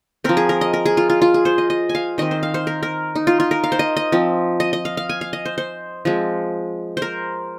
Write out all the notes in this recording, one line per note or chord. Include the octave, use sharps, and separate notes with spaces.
F3 C4 A#4
G#4
A#4
D#5
A#4
G#4
F4
F4
F4
G#4
C5
D#5
D#5
G#5
F5
D#3 C4 D#5
C5
F5
C5
A#4
A#4
D#4
F4
F4
A#4
F5
C5
D#5
D#5
F3 C4
D#5
D#5
F5
F5
G#5
F5
D#5
C5
C5
F3 G#3 C4
A#4 C5